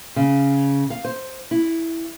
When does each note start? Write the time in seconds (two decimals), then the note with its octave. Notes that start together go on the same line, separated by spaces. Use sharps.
0.16 C#3
0.90 F5
1.05 C5
1.51 E4